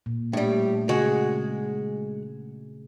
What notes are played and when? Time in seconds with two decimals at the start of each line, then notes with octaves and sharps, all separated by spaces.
0.06 A#2
0.33 A2 G3 A3 D4
0.89 C#3 G#3 F#4 G#4 F#5